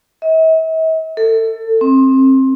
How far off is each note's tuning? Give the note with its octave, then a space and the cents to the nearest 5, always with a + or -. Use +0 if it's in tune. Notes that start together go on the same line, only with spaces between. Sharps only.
E5 -45
A4 +25
C4 +25